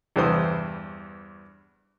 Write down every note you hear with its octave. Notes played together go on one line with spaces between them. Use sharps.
E2 G2 E3 C5 D#6